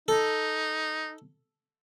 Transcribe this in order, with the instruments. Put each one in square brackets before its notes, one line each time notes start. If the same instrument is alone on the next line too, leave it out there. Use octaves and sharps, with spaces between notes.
[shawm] D#4 [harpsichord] A4